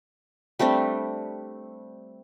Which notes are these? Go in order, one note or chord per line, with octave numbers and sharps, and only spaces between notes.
G3 A3 C4 D4